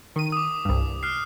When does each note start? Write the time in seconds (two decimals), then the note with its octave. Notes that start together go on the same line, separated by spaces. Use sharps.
0.16 D#3 D#7
0.32 D6 D#6
0.65 C2 G2
1.03 F6 F#6 C7